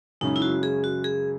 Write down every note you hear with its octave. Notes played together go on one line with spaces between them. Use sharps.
F#2 C#3 G#3 C#4 D#4
E4
F#4
G#4
F#4
G#4